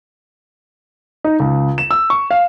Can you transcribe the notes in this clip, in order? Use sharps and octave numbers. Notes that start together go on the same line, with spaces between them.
D#4
C#2
E7
E6
C#6
F5